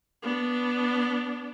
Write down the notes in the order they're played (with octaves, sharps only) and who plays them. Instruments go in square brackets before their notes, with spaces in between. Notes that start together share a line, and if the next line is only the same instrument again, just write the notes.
[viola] B3 D4